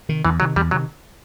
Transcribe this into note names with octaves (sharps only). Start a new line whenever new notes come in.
C3 D#3
E2 E3
C3 D#3 F#3
E2 G3
C3 D#3 F#3